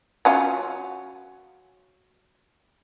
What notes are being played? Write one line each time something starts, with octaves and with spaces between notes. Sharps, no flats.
F#3 C#4 F4